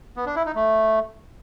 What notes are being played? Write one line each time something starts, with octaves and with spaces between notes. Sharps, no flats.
B3
D4
E4
D#4
A3